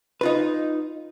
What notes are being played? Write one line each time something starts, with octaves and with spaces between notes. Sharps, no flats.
D#4 F4 B4